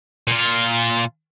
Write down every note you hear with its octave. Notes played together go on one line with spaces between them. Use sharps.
A#2 F4